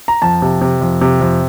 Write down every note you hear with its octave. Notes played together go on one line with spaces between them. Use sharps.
A#5
F2 A5
C3
C3
F2
C3
F2